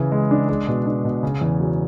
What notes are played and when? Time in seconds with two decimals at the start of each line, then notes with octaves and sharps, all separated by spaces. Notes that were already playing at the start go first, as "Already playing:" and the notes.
Already playing: C#3 E3 E4
0.12 G#3
0.31 D4
0.49 G#3
0.68 B2
0.86 D4
1.05 B2
1.23 C#3
1.41 E2
1.60 F#3